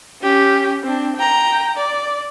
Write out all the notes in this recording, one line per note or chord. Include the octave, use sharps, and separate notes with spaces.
C#4 G4
C4 D4
G5 A#5
D5